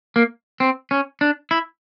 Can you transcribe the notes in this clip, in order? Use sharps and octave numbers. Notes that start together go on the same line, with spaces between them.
A#3
C4
C#4
D4
E4